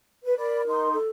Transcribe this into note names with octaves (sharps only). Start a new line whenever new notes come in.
B4
A#4 D5 B5
D#4 C6
A4